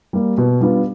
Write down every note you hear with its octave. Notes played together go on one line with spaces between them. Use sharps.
G3 A#3
B2
G3 B3 D4 F4